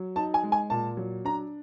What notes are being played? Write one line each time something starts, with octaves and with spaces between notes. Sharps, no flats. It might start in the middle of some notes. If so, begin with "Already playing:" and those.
Already playing: F#3
D#4 A5
G#5
G#3
G#5
A#2 A5
F#3
D4 A#5